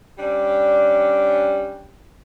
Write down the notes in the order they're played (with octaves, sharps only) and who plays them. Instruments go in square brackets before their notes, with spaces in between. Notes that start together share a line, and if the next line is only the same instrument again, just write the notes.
[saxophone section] G3 C#4 D4